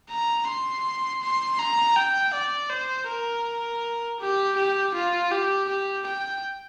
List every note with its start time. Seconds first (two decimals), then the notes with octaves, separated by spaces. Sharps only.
0.10 A#5
0.47 C6
1.23 C6
1.59 A#5
1.96 G5
2.34 D5
2.71 C5
3.08 A#4
4.21 G4
4.57 G4
4.95 F4
5.32 G4
5.69 G4
6.06 G5